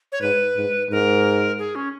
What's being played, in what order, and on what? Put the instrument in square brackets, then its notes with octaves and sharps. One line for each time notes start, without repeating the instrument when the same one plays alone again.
[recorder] C#5
[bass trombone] G#2 [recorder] B4
[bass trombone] G#2
[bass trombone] G#2 [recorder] A#4
[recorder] G#4
C#4